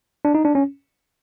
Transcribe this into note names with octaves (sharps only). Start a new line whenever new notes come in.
D4
D#4
D4
C#4